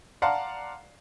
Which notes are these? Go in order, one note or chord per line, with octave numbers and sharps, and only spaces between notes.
D5 F5 F#5 A5 A#5 C6